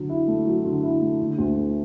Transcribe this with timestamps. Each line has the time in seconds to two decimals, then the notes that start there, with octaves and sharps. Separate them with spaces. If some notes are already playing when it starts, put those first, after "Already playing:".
Already playing: D3 F#3
0.09 E4
0.28 A3
0.47 F#3
0.65 D3
0.83 E4
1.02 A3
1.20 D3
1.38 D2
1.57 A3